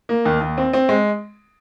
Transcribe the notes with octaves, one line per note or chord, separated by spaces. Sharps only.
A#3
D#2
D#2
C4
C4
G#3